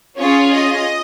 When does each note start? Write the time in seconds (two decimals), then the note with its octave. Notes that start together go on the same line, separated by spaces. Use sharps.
0.19 C#4 F4 G#4 C#5
0.55 D#5